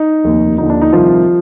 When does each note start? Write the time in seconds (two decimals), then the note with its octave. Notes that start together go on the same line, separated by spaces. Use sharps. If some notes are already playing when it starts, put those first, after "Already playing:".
Already playing: D#4
0.24 F1 D#2 D#3
0.58 D#2 D3 F3 D#4
0.70 D4
0.82 D#4
0.93 C2 C3 D#3 F3 F4